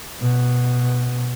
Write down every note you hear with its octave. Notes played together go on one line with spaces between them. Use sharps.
B2